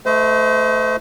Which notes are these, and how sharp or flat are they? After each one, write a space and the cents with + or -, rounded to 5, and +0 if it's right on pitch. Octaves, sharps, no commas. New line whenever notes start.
A3 +0 C5 -40 D#5 +30